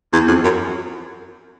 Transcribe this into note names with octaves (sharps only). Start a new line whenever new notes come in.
E2
F2
F#2